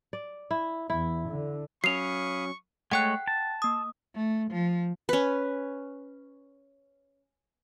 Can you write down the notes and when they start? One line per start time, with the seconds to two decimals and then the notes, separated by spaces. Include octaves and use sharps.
0.13 D5
0.51 E4
0.90 E2 E4
1.28 D3
1.84 F#3 C#4 F5 B5 C#6 D#6 C7 F7
2.91 G#3 A3 C#5 F#5 G5 F#6
3.28 A5
3.62 A#3 D#6
4.14 A3
4.50 F3
5.09 C#4 B4